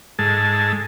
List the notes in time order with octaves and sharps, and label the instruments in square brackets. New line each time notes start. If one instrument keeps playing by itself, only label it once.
[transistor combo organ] G#2 G#3 A4 A5